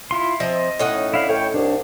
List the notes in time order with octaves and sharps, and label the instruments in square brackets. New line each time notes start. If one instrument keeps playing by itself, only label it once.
[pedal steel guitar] E4 F4 C6
[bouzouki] F3 C4 E5 [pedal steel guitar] D#5
[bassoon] A2 [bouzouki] C#4 D#4 F#5
[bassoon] D3 [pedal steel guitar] E4 F5
[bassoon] A2 [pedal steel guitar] C#5 G5
[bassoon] C2 [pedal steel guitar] D4